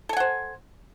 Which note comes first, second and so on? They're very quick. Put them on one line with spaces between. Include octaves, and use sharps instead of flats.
A4 G#5 F#5 C5